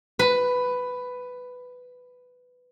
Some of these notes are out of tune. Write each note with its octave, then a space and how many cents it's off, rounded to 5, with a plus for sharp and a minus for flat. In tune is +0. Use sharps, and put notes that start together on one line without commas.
B4 +10